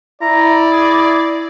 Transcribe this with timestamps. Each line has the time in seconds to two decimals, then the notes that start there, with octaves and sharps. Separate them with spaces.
0.22 E4 D5 A#5
0.72 G#4